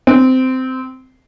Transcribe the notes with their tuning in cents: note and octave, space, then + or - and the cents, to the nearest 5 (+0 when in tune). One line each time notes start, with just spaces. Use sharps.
C4 -15